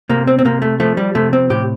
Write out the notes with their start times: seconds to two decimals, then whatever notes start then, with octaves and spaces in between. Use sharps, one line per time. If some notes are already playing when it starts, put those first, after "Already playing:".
0.09 C3 A#3
0.27 C4
0.39 C4
0.45 C3 A#3
0.62 A3
0.80 F3 A3
0.97 G3
1.15 C3 A3
1.33 C4
1.50 A2 G4